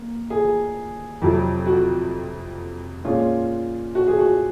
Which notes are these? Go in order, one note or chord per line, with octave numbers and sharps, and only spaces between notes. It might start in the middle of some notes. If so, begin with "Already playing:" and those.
Already playing: A#3
G#4
F2 C3 F#3
F#4
A#2 G#3 C#4 F4
F#4
G#4
F#4